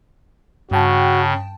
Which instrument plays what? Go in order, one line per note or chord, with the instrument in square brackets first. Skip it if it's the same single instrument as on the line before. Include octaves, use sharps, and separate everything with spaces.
[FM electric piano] G2 G5 A5 [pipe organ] C#3 [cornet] F#4